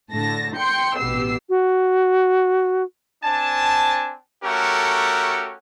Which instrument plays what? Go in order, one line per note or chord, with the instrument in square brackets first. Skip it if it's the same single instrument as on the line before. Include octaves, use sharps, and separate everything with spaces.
[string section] A2 D3 A5 A#6
G5 C6 G6 C#7
A1 B2 B3 G4 E6 C7
[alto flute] F#4
[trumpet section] C4 D4 G#5 A5
A3 C#4 F#4 G4 A4 A#4